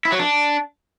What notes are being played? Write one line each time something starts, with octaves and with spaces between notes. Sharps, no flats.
E4
F#3
D4